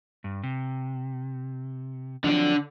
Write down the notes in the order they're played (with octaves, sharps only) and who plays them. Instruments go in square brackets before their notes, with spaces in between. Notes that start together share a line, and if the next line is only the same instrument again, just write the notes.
[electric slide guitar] G2
C3
[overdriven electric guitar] D3 D4 [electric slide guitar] F3 F#3 C4